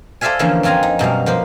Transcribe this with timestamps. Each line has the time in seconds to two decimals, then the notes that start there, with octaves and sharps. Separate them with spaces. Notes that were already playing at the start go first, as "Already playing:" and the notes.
0.21 A4 C5 D5 E5 F5 G#5
0.39 D3 E3 F3 A#3 C#4
0.63 F2 C4 F4 G#5 A#5 C6
0.83 D#4
0.99 F#2 B2 G3 F5
1.26 F3 A#3 B4 C5